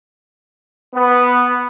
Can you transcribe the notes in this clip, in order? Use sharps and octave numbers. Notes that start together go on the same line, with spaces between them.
B3